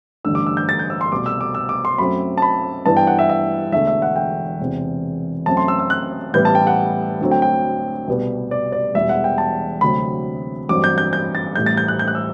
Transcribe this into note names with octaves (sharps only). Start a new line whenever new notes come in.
A1 G2 D3 E6
D6
E6
G6
A6
G6
E6
C6
C2 B2 A3 D6
E6
D6
E6
D6
C6
F#2 F#3 A3 C4 B5
A5
B5
G2 E3 B3 A5
G5
F#5
E5
E5
E1 E2 D3 A3 E5
E5
F#5
G5
E1 E2 C3
F#2 F#3 A3 C4 A5
C6
E6
E6
F#6
A1 A2 G3 B3 G6
A5
G5
F#5
D2 D3 F#3 C4
G5
G5
C2 B2 G3 B3
D5
D5
E1 E2 B2 G3 E5
F#5
G5
A5
D2 C3 F#3 C4 B5
A1 G2 F#3 C4 D6
G6
G6
G6
A6
A1 A2 G3 G6
A6
G6
F#6
G6
F#6
E6